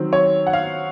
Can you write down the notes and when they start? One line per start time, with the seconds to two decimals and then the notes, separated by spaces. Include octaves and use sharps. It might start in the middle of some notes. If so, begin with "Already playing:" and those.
Already playing: D#3 F#3 C4
0.13 C#5
0.47 F#5
0.53 F5